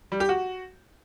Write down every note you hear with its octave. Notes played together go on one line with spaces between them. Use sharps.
G3
G4
F#4